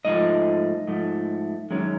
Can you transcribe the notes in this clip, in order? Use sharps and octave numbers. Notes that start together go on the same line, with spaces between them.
G#2 F3 A3 D#5
G#2 F3 A3
F#2 D#3 G#3 C#4